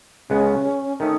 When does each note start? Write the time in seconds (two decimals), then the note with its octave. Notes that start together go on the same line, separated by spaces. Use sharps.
0.30 C#2 C#3 G#3 B3 C#4
1.00 D#3 A3 C#4 D#4